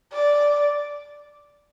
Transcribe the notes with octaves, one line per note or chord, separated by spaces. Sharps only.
D5